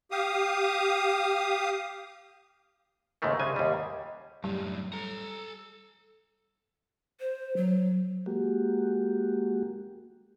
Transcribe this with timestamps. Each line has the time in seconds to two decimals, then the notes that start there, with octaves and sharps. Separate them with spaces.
0.11 G4 F5 D#6
3.22 D#2 G#2 C#3 A3 A#3
3.39 C2 C#3 G#3 G#5
3.56 D#2 G#2 G3
4.44 F#2 A2 G3
4.93 A4 A#5
7.20 C5
7.57 F#3
8.26 G#3 A#3 F#4 G4